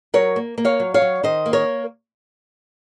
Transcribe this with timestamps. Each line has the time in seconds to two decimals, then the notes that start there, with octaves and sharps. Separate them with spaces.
0.14 F#3 A#4 C#5
0.36 A#3
0.58 A#3
0.65 C#5 F5
0.80 F#3
0.94 C#5 F5
1.02 F#3
1.23 D#3 C5 D#5
1.46 A#3
1.53 A#4 C#5